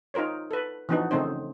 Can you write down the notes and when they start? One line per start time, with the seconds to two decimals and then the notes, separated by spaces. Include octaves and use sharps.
0.14 D#4 F4 A#4 C5 C#5
0.51 A4 B4
0.89 E3 F3 B3 D4 D#4 F#4
1.11 C#3 A3 C4 D#4 C5